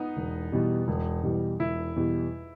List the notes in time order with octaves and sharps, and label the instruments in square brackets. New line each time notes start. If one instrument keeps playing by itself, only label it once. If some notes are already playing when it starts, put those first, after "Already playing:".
Already playing: [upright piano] B3 D#4
[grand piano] E1
E2 B2 G3
E1
E2 B2 G3
[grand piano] E1 [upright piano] E4
[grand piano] E2 B2 G3